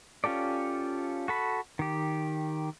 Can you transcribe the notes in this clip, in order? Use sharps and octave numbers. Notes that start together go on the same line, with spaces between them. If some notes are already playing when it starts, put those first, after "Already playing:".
C#4 F4 G4 A4 D5
F#4 A4 B5
D#3 G4